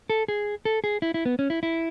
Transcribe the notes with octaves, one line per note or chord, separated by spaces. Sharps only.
A4
G#4
A4
G#4
E4
E4
B3
C#4
E4
E4